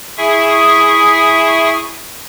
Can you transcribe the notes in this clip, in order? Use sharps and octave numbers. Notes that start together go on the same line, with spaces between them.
E4 G#4 E5 G#5 C#6 D#6